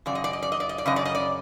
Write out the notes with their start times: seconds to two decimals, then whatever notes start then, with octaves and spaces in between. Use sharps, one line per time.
0.06 F#2 C#3 D5
0.15 D#5
0.24 D5
0.33 D#5
0.42 D5
0.52 D#5
0.60 D5
0.69 D#5
0.78 D5
0.86 F#2 C#3 D#5
0.96 D5
1.05 D#5
1.15 D5